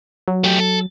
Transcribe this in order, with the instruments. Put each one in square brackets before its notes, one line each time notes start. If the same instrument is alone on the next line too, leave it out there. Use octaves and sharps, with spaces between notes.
[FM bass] F#3
[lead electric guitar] A3 G4
A4